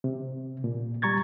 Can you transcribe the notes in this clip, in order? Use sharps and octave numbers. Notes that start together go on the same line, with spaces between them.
C3
A#2
G3 A#5 C#6 G#6 A6